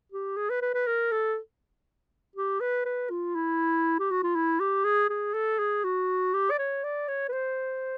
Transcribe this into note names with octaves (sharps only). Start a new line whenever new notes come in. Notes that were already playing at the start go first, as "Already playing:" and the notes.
G4
G#4
B4
B4
B4
A#4
A4
G4
B4
B4
F4
E4
G4
F#4
F4
E4
G4
G#4
G#4
A4
G#4
F#4
G4
D5
C#5
D5
C#5
B4
C5